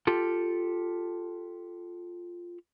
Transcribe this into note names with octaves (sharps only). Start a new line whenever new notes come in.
F4 G4 A4